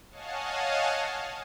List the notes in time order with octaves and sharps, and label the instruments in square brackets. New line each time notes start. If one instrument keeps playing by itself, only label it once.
[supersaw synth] C#5 D#5 F5 F#5 G#5 A5